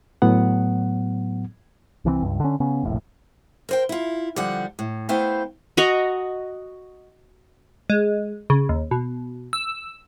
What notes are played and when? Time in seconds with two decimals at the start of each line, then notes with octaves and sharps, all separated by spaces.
0.22 A2 F#3 B3 F#5
2.05 C2 E3 F3 C4
2.22 C#2 G2
2.40 D3 C#4
2.60 C#3 B3 C#4
2.83 F1 A#1 A2
3.69 A#4 C5 G5
3.89 E4 F4
4.36 D3 F3 G3 F#5
4.79 A2
5.09 A3 B3 E4 C5 F5 G5
5.77 F#4 D#5 A#5 C#6
7.90 G#3
8.50 C#3
8.69 D#2
8.91 B2
9.53 E6